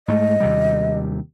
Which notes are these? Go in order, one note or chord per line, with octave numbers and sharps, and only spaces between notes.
G#2 A3 D#5
D#2 C3 G3